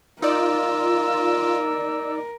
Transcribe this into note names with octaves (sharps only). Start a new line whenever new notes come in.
D#4 F4 A#4 D5 E6